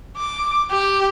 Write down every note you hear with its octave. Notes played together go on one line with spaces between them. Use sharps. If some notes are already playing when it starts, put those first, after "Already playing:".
D6
G4